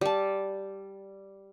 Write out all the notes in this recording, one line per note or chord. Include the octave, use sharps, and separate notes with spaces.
G3 A5